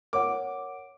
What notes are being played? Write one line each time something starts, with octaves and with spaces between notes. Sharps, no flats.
A#4 C#5 F#5 D6